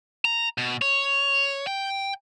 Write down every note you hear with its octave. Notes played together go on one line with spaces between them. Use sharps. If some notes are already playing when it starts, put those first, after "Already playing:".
A#5
B2
C#5
G5